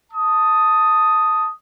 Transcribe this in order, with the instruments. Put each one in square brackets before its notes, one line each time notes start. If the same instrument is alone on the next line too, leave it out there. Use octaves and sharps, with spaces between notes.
[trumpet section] A5 D#6